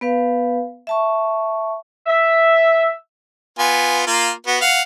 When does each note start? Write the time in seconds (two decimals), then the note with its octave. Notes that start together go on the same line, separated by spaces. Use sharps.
0.01 B3 B4 F5
0.87 E5 A5 C#6
2.07 E5
3.59 B3 F4 G#5
4.07 A#3 F4
4.47 B3 F#4
4.61 F5 F#5